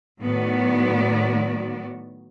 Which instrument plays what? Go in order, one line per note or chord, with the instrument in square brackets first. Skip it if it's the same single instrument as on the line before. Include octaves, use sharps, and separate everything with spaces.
[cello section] A2 D#3 F#3 B3 F#4 D5